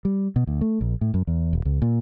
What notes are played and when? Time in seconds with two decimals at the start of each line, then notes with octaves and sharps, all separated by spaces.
0.05 G3
0.36 B2
0.47 D2
0.61 A3
0.81 A#1
1.01 A2
1.14 F#2
1.27 E2
1.53 D#1
1.65 C#2
1.82 A#2